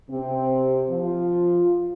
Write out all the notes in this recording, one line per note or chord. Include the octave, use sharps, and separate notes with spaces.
C3 C4
F3 F4